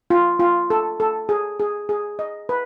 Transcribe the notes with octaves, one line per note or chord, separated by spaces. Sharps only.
F4
F4
A4
A4
G#4
G#4
G#4
D#5
B4